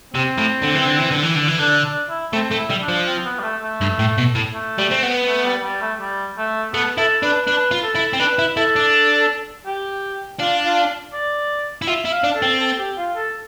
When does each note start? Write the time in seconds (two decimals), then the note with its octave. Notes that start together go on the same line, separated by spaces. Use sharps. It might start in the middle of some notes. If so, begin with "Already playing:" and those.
0.14 C3 C4
0.38 A2
0.63 D3
0.75 E3
0.86 D3
0.99 E3
1.11 D3
1.23 E3
1.35 D3
1.48 E3
1.59 D3 D4
1.84 D4
2.10 E4
2.33 A3 C4
2.51 A3
2.58 E4
2.70 G3
2.82 D4
2.89 F3
3.07 C4
3.25 B3
3.39 G3
3.43 A3
3.62 A3
3.81 G2
3.99 A2
4.18 B2
4.35 A2
4.54 A3
4.79 G3
4.91 C4
5.03 B3
5.27 A3
5.45 G3
5.64 G3
5.81 A3
6.00 G3
6.38 A3
6.73 A3 B3
6.98 E4 A4
7.23 D4 B4
7.47 D4 B4
7.71 F4
7.83 A4
7.95 E4
8.13 C4
8.20 D4 B4
8.39 E4
8.57 E4 A4
8.76 D4
9.66 G4
10.40 D4 F4
10.65 F4
11.13 D5
11.82 E4
11.87 F4 E5
12.05 E4
12.12 F5
12.24 D4
12.35 A4
12.42 C4
12.60 A4
12.79 G4
12.97 F4
13.16 A4